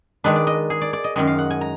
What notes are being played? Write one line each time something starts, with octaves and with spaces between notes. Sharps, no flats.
D#3 G#3 D4 B4
D5
D#5
G#4
D5
D5
D#5
F#2 D#3 G#3 D#5
F5
F#5
G#5
A#5